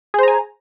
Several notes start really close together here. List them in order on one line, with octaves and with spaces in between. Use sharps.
G#4 C5 A#5 G#5